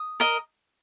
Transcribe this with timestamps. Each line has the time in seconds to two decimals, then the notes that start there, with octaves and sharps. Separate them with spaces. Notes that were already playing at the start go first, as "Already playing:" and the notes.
Already playing: D#6
0.20 A#4 D#5